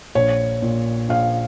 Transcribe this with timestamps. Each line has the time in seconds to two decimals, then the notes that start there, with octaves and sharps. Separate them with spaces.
0.15 A#1 C#5
0.62 A#2
1.09 A#1 F5